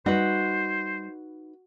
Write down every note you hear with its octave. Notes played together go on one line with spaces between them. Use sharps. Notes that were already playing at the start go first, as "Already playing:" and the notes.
G3 D#4 F#4 B4 C5